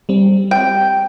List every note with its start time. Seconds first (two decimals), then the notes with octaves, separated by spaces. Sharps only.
0.09 G3 C4
0.51 G5